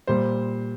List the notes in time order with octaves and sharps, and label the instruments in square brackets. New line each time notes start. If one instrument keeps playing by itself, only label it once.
[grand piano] A#2 G3 C5